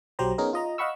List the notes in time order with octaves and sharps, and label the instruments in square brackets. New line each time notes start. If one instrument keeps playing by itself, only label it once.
[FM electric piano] B1 F#3 G4 C5 A#5
B3 C#4 D#4 G#4 A#4
F4 D#5 A#5
D#5 F5 F#5 B5 C#6 E6